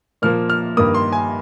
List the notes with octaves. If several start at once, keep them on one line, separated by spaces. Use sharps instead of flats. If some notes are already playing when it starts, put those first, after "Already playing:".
A#2 F3 A#3 F6
F6
G2 D#3 A#3 D#6
C6
G#5